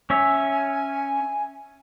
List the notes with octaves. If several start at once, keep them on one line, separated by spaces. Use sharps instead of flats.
C#4 C#5 E5 G#5